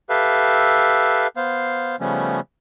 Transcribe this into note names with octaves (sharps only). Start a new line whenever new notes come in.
G4 A4 B4 E5 F5
B3 C5 F5
C#3 F3 G3 A3 B3 C#4